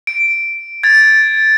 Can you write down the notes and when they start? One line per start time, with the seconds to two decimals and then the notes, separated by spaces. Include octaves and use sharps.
0.07 D7
0.83 G#6 A6